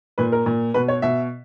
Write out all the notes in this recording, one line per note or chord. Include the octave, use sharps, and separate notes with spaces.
A#2 B4
A#4
A#2
B2 B4
C#5
B2 E5